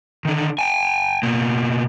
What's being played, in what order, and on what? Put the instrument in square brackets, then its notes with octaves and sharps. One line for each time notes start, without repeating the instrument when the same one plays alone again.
[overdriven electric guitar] D3 D#3
G5 G#5
B2 A#3